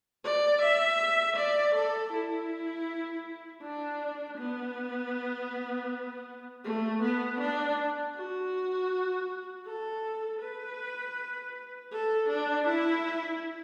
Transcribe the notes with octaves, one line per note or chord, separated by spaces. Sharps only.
D5
E5
D5
A4
E4
D4
B3
A3
B3
D4
F#4
A4
B4
A4
D4
E4